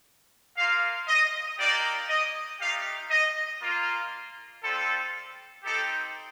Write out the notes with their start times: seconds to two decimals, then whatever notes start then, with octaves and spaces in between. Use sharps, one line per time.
0.57 A#3 F4 F5
1.07 D#5
1.58 A#3 D#4 G4 D5
2.09 D#5
2.60 A3 D#4 G4 F5
3.11 D#5
3.61 A#3 F4
4.63 G3 C4 F4 A4
5.64 C4 D#4 G4 A4